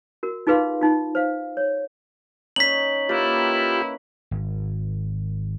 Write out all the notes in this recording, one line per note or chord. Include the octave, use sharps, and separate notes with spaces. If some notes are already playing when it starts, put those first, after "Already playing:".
F#4 A#4
D#4 F4 G#4 B4 F5 C6
D#4 F4
C5 F5
C#5
C#4 D#4 B6 F#7
A#3 E4 F4 G4 A#4 B4
G#1